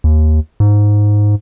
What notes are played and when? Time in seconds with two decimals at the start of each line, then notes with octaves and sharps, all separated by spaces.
0.04 D#2
0.60 G#2